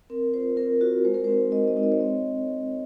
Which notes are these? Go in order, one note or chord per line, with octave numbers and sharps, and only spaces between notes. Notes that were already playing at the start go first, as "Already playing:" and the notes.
C4 A#4
F4 C5
C4 A#4
F4 F#4
G#3 C5
A#4
C5
C4 D#4 F#4
G#3 D#5
D#5
C4 D#4 F#4
D#5
C#5
C4 D#5